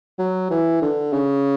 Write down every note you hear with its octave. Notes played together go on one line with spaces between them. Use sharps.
F#3
E3
D3
C#3